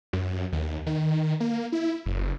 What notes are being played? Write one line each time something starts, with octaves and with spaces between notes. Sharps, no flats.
F#2
D#2
D#3
A#3
E4
F#1